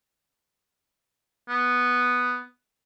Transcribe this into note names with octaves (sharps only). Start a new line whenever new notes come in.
B3